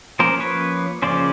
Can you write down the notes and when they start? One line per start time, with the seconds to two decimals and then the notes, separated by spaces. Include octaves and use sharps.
0.19 F3 A#3 C#4 A#4 C5
0.40 B4 C#5
1.02 C#3 F3 A#3 C#4 C5 D5